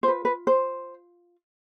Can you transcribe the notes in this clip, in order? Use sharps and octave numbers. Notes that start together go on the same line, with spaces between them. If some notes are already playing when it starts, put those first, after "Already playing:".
F4 B4 C5
B4
C5